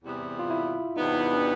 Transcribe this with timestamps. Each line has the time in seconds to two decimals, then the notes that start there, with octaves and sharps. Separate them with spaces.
0.04 E2 C3 E3 G3 B3
0.39 F4
0.50 E4
0.97 E2 C3 E3 G3 B3 D#4
1.33 D4